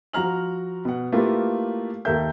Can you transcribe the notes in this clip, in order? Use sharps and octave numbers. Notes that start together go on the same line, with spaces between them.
F3 F#4 A#5 F6 F#7
B2 F#5
A3 A#3 E4 F4 G4 B4
D#2 A4 A#4 E5 G6